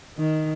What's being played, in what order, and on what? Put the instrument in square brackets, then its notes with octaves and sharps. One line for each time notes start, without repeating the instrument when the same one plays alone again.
[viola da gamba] D#3